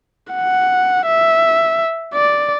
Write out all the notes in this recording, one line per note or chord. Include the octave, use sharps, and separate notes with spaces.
F#5
E5
D5